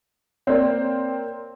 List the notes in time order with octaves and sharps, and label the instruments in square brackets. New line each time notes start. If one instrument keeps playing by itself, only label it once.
[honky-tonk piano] A#3 C4 [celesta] C#5 D5